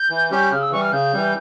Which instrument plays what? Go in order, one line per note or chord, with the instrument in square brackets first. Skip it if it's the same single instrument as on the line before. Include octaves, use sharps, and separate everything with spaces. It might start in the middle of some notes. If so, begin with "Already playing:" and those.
Already playing: [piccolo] G6
[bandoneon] E3
G3 C#4 G4
[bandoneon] C#3 [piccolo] F6
[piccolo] E6
[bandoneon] E3 G3 [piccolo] C#6
[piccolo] F6
[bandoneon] C#3 [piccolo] G6
[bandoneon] E3 G3